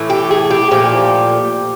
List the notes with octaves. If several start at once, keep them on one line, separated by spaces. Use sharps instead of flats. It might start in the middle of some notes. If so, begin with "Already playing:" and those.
Already playing: A2 E3 A3
G4
G#4
G4
A#2 F3 A3 G4